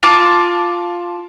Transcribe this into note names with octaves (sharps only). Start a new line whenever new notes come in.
F4 A5 D6